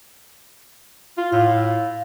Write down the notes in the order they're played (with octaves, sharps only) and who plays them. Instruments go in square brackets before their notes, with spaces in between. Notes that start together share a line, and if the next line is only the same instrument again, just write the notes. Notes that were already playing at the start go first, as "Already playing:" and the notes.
[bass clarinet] F4
[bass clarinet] A2 [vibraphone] F5